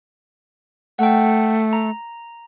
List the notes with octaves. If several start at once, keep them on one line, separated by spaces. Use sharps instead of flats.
A3 F#5 G5
A#5